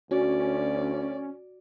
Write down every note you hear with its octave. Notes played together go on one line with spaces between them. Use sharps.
D2 C#4 F#4 D5